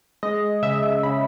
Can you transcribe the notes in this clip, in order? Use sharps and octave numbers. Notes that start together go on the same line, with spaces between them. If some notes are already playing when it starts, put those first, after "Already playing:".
G#3 D#5
C#3 E5
C#3 B5